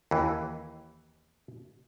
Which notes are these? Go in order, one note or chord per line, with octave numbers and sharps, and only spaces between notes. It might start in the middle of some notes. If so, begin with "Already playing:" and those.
D#2 E3